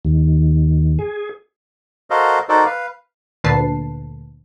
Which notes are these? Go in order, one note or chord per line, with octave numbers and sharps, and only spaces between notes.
D#2
G#4
F#4 A4 A#4 C5 D#5 F5
D#4 F#4 A4 A#4 C5 D5
B4 F5
D2 A#2 D3 B4 A5 C7